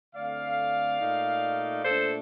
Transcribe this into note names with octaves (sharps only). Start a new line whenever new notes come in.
D3 A3 C4 D5 F5
A#2 A3 D#4
A#2 A3 D4 A4 C5